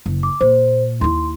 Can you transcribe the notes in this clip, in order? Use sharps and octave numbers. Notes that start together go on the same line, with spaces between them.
F#1
D6
A#2 C5
D#2 E4 C6